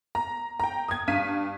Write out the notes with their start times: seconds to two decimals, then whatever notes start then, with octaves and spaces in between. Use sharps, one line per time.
0.15 A#5
0.60 G5 A#5
0.88 D#6 G#6
1.08 G2 F5 B6 D#7